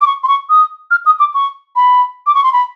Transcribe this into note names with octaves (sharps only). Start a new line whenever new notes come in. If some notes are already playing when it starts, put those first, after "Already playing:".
D6
C#6
C6
C#6
D#6
F6
D#6
D6
C#6
B5
D6
C#6
C6
B5